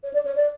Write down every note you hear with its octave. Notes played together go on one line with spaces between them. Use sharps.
C#5
D5
C#5
D5